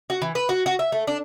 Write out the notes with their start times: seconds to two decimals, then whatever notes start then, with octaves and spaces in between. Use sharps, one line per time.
0.10 F#4
0.22 E3
0.35 B4
0.49 F#4
0.66 F#4
0.79 E5
0.92 A3
1.07 D4